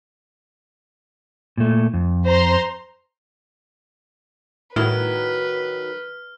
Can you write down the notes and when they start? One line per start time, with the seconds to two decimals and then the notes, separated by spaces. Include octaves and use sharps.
1.57 A#2 A3
1.94 F2
2.26 C5 A#5 C6
4.76 A2 D#3 F#3 E4 B4 F6